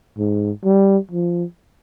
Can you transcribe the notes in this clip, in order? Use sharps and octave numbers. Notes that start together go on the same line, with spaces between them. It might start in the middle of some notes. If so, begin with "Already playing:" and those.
G#2
G3
F3